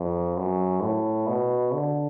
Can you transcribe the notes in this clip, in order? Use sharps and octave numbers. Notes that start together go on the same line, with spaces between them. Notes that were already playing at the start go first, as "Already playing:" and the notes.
Already playing: F2
F#2
A2
B2
D3